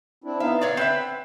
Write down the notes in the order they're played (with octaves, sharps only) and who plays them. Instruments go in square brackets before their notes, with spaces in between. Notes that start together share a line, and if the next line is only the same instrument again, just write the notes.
[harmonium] C4 D4 E4
[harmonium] B3 D#4 F5 [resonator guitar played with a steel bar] E5
[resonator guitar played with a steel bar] A#2 C#5 D5
[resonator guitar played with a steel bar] C4 B4 E5 [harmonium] F#5